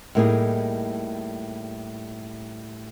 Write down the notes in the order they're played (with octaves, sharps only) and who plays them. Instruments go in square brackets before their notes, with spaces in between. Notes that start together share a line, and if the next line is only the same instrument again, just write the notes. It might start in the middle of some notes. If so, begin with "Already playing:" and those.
[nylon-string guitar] A2 G3 A#3 D#4 F#4 G#4